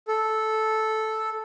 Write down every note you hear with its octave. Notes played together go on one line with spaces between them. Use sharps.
A4